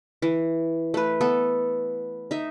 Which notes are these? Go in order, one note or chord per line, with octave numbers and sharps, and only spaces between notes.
E3
A3 B4
B3 A4
D#4 E5